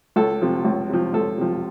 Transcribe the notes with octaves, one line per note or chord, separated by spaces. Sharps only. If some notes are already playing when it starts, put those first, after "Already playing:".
C#2 A4
C3 F3
C#2
C3 F3
C#2 A4
C3 F3